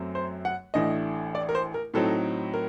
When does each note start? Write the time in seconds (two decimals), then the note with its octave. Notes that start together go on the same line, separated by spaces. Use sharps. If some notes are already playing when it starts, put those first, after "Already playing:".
Already playing: F#2 F#3 A3 C4
0.15 C5
0.45 F#5
0.74 A1 A2 A3 D4 D#5
1.35 D5
1.49 A#4
1.55 C5
1.74 A#4
1.94 A2 F#3 C4 D#4 A4
2.54 A#4